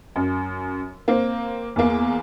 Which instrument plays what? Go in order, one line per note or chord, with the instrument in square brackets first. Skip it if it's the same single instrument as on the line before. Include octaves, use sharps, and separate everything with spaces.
[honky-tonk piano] F#2
A#3 C4
E2 A#3